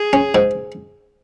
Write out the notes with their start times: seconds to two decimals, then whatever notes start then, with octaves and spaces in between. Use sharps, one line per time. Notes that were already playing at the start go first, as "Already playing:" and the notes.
Already playing: G#4
0.13 C#4
0.35 G#2